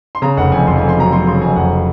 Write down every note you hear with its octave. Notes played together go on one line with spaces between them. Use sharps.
C6
C#3 A#5
F1 F#5
F2 G#5
F2 C6
G#5
F2
C6
F#3 A#5
F#3 C6
C#3 C6
F2 G#5
F2 F#5